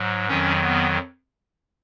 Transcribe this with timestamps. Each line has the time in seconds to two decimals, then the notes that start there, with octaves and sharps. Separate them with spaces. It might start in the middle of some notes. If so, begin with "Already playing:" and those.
Already playing: G#2 F#3
0.28 F2 D#3 F#3 C#4
0.63 B3